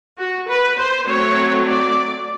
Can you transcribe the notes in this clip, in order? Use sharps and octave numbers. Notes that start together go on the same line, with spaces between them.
F#4
B4
C5
F#3 A3 C4 C#5
D5